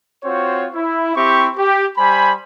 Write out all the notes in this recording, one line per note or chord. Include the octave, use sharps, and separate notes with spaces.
C4 F4 F#4 C5 C#5
E4
C4 E4 G4 E5 C#6
G4
G3 C5 G#5 B5